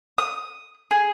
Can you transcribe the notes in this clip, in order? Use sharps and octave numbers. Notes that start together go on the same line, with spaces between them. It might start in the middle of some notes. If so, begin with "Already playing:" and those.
D#6
G#4